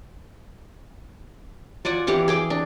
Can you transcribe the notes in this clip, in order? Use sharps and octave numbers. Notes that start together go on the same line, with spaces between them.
F4 D5 F#5 G#5
E3 G4 F5 F#5
G#4 G5 D6
D4